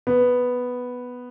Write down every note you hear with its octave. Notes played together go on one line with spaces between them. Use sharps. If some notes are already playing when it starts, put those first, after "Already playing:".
B3